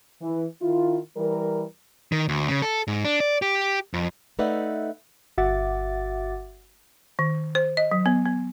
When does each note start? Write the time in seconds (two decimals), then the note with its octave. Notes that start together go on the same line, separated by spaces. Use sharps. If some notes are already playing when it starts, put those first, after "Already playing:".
0.22 E3
0.62 D#3 E4 F4
1.17 E3 G3 A#4
2.12 D#3
2.29 D2
2.49 C#3
2.62 A4
2.88 G#2
3.05 D4
3.20 D5
3.42 G4
3.94 F2
4.39 A3 D#4 B4 D5 E5 F#5
5.37 G1 F#4 E5 F#5 D6 A6
7.19 D#3
7.55 C5
7.77 D#5
7.92 F#3
8.06 B3
8.25 B3